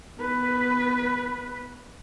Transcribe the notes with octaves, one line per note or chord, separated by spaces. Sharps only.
B3 B4